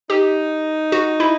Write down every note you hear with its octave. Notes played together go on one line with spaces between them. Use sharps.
D#4 G4
F#4
E4